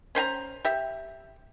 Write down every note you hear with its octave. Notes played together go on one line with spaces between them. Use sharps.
C#4 C5 G#5 A#5
G4 E5